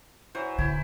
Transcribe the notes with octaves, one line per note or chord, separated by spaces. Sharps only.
E3 F#3 C5
D#1 D3 E4